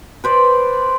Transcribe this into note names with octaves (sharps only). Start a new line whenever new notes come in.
B4 C5 D5